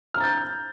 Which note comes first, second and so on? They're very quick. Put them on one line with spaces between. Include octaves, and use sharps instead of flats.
F6 A#5 A6 G6